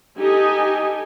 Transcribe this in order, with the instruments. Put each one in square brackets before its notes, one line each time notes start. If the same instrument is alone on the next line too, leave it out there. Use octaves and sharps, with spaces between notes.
[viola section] D#4 G4 A4 D#5 G#5